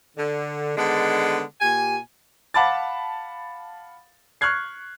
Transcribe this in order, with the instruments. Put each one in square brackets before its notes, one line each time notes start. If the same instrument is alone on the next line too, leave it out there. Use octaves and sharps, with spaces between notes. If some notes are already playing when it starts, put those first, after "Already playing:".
[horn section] D3
D3 D#3 G#3 B3 D4
A#2 G4 G#5
[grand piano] F5 F#5 A5 B5 D6 A6
C#6 F6 F#6 G#6 C7